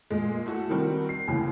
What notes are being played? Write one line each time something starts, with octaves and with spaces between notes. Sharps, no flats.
A#2 G#3
A3 F#4 A4
D#3 G3 C4 F#4 A#4
C7
D#2 A2 C#3 E3